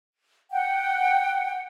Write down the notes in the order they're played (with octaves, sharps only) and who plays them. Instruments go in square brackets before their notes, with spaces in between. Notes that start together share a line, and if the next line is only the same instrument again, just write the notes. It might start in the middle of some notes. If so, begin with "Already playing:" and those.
[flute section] F#5 G5